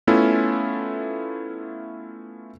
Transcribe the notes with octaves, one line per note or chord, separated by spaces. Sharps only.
A3 B3 C#4 E4 F4 A4